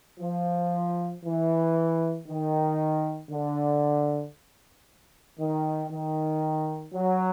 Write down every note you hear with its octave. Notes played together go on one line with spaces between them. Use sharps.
F3
E3
D#3
D3
D#3
D#3
F#3